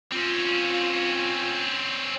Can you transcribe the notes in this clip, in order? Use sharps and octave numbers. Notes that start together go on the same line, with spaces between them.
C4 C#4 F4